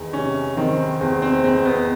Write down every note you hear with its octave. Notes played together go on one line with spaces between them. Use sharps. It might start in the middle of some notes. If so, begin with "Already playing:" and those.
Already playing: E2 D#3
C3 C#4
D#3 C4
E2 C4
C4
E2 C4
B3